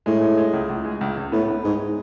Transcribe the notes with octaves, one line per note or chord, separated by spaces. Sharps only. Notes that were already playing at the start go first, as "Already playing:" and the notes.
A2 G#3
G#3
G#3
C#2
C#2
G#3
C#2
C#2
A2 B3
B3
G#2 G#3
G#3